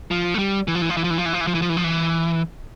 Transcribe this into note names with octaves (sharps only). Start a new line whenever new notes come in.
F3
A3
G3
E3
F3
E3
F3
E3
F3
E3
F3
E3
F3
E3
F3
E3
F3
E3
F3
E3